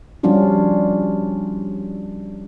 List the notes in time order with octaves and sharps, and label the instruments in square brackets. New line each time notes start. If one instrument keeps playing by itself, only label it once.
[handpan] F3 G3 C#4 D4 F4 F#4